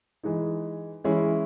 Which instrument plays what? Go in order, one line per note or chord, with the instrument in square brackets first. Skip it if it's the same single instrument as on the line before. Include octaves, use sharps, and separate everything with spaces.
[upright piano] E3 G#3 D#4
E3 G#3 C#4 E4